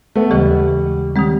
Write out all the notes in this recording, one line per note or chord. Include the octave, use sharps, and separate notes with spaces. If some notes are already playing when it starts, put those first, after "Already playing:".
A3 B3
D#2 C#3 E3 G3 G#3
D#3 G3 G#3 C4